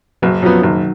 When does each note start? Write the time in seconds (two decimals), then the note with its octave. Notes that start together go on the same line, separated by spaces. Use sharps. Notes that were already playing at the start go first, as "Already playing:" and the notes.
0.22 F#1 F#3
0.42 F#2 F3 F#3 B3
0.62 F#1 D#3